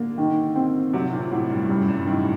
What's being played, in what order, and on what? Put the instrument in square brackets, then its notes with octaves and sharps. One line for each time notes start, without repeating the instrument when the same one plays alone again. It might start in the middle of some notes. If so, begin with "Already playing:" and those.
Already playing: [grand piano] D3 [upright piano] A#3
[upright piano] D#3
C4
[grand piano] C3 [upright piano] F#3
[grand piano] A#2
[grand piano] A2 [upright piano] F#3
[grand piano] G2
[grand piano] F#2 [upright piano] G3
[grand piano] G2
[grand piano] A2 [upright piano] D#3